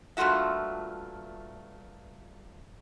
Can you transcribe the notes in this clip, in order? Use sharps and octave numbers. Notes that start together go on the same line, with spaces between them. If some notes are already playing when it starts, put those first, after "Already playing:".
G2 A#2 A3 F4 F#4 E5